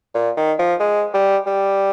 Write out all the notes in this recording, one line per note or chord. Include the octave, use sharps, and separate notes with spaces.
A#2
D#3
F3
G#3
G3
G3